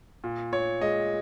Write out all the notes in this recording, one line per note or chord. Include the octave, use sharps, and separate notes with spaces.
A#2
A#2 C#5
G#3 D#5